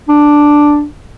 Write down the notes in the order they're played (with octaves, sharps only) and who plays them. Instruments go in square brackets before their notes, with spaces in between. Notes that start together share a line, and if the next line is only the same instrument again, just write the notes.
[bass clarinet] D4